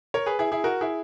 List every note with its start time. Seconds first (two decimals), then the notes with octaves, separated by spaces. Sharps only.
0.14 A#4 C#5
0.26 G#4 B4
0.39 E4 G#4
0.52 E4 G#4
0.64 F#4 A#4
0.81 E4 G#4